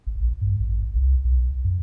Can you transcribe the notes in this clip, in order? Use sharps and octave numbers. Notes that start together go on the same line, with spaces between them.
G#1
A#1
G2
A1
G#1
C2
B1
F#2